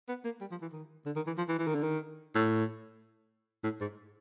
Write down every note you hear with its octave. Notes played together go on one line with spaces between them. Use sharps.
B3
A#3
G3
F3
E3
D#3
D3
D#3
E3
F3
E3
E3
D#3
D3
D#3
A2
A2
G#2